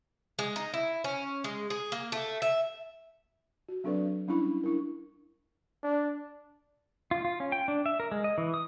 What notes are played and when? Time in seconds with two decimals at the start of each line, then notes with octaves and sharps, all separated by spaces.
0.39 G#3
0.56 D#4
0.74 E4
1.04 C#4
1.44 G#3
1.70 G#4
1.92 A#3
2.12 A3
2.42 E5
3.69 F#4
3.84 F#3 C4 D4 A4 B4 D5
4.28 G3 C#4 D4 E4 B5
4.64 D4 E4 A#4
5.83 D4
7.11 F4
7.25 F4
7.40 C#4
7.52 G5
7.68 D4
7.86 E5
8.00 A#4
8.12 G#3
8.24 D#5
8.38 E3
8.54 D#6